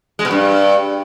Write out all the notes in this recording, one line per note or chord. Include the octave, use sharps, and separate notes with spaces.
G#3
B2
G2